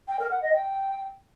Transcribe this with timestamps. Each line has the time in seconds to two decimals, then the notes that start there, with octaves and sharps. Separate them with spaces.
0.08 G5
0.19 A#4
0.31 F#5
0.42 D#5
0.53 G5